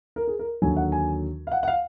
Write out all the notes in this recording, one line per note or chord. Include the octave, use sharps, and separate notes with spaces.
A#4
G#4
A#4
D#2 D3 F#3 G#5
F#5
G#5
F5
F#5
F#5
F5